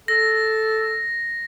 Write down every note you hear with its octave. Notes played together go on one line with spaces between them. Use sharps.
A4 A#6